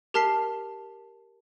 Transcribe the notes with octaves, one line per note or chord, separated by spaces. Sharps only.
G4 A#4 A5 F6 B6 C7